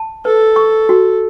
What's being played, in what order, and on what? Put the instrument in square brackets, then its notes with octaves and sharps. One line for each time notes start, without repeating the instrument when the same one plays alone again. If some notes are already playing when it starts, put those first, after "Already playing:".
Already playing: [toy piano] A5
[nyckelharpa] A4 [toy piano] B4
[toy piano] C#6
F#4